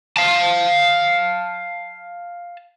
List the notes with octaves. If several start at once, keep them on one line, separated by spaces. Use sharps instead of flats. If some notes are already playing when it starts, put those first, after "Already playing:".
F5 A5